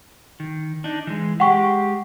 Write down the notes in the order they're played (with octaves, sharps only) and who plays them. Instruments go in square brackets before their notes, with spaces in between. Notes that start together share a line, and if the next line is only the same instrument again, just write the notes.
[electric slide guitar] D#3
D4 D#4
E3 G#3
[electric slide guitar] G#3 G4 [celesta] F#5 G5 C#6